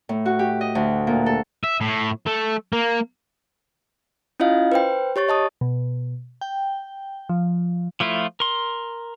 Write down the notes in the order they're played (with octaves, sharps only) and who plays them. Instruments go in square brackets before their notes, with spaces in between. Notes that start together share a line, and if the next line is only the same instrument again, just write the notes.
[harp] A2
F#4
G4
D#5
D2
A#2
A4
[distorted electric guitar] E5
A2
A3
A#3
[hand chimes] C#4 E4 F4 D#5 F5
B4 C5 G5
G4 C#5 C#6 A6
D#5 A5 D#6
[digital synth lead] B2
G5
F3
[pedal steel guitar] F3 A3 E4 F4
A#4 C6